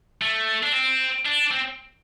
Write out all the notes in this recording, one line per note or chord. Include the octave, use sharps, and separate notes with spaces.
A3
D4
C4
D4
C4